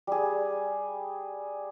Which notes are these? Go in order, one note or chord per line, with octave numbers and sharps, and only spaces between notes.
G3 G#4